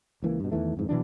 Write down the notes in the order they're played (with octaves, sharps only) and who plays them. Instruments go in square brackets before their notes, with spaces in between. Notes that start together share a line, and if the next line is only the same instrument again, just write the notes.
[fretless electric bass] C#2 E3 A#3
G2 B2
E2 D#3 E3 A3
F2 G#2 E3
B2 E3 F#3 D4